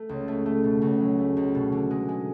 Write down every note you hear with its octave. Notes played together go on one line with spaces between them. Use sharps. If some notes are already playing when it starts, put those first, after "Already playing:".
Already playing: A3
C#2
A3
A3
B2
C#2
F#3
A3
C#2
B2
D3
G#3
G#3